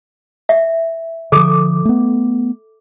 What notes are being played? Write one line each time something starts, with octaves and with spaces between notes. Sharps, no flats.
E5
D3 F3 A4 D6
A3 B3